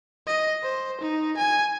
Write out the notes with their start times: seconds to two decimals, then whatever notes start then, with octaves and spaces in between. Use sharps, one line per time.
0.27 D#5
0.63 C5
1.01 D#4
1.37 G#5